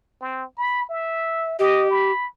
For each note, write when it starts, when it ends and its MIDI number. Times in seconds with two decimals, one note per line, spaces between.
0.21 0.44 60
0.57 0.87 83
0.89 1.54 76
1.59 2.12 67
1.59 1.88 75
1.90 2.26 83